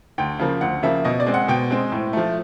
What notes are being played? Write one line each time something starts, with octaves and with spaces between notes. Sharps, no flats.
D2 G5
C#3 F3 A#3
D2 F#5
C#3 F3 A#3 E5
B2 D#5
D5
G#3 C4
F#5
B2 G5
G#3 C4
A2
F3 A3